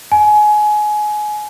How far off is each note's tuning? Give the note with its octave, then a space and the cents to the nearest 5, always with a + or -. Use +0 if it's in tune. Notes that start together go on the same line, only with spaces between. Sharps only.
G#5 +25